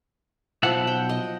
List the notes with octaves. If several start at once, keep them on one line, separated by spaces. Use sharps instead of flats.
B1 F3 E4 E5 F#5
G5
D#5